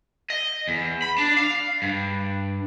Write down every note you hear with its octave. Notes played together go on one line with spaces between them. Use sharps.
D#5
E2
B5
D4
F5
G2